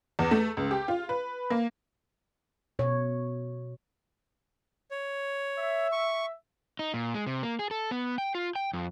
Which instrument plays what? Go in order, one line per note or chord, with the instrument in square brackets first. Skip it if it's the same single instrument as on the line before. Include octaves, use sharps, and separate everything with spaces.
[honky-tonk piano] E2
A3
C#2
G4
F4
B4
A#3
[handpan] B2 C#5
[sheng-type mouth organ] C#5
[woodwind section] E5
[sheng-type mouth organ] C#6
[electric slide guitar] D#4
A#2
G#3
C3
A#3
G#4
A4
B3
G5
F4
G5
F2